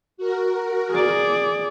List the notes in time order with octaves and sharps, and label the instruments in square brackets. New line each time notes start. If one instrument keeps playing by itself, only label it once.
[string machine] F#4 A#4
[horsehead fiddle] G#4 D5